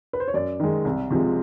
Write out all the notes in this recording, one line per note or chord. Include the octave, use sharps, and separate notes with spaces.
B4
C5
C#5
F#2 D5
D#3 G#3
C2
C3 F3 G#3